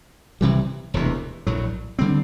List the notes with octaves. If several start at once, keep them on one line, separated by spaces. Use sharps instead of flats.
C2 C3 E3 G3
E1 D2 C3 E3
A#1 A2 F#3
D3 G3 C4